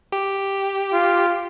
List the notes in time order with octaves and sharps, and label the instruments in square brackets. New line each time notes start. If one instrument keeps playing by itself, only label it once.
[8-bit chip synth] G4
[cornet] F4